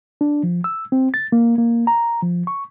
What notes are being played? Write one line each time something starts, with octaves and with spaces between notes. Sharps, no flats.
D4
F3
E6
C4
A6
A#3
A#3
A#5
F3
C#6